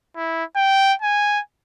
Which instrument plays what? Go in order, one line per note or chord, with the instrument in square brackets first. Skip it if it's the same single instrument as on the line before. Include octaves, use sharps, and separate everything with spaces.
[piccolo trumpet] E4
G5
G#5